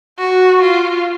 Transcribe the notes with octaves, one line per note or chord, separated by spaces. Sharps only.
F#4
F4